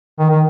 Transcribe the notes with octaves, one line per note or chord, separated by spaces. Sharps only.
D#3
D#3